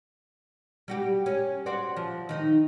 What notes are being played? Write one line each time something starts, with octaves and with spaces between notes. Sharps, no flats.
G3 F#4 G4
C#4
F#4 C5 D5
F3
D#3 D#4